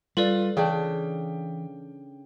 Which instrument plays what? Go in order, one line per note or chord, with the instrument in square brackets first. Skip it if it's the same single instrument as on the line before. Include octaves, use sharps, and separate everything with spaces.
[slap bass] G3 [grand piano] F4 [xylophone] A4 B4 D5
[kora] C#3 D4 [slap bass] E3 [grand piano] G5